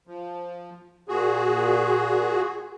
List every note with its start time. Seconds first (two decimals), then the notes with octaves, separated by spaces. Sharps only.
0.07 F3
1.08 A#2 F#4 G#4